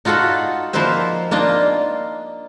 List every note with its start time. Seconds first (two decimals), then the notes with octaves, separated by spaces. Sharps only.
0.05 D#4 F4 F#4 A4 B5
0.73 F3 A#3 D#4 B4 C5 E5
1.31 A#3 D4 D#4 F4 D#5